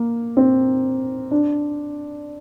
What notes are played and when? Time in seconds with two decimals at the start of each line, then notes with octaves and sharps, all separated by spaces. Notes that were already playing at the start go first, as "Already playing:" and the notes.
Already playing: A#3
0.37 C4
1.31 D4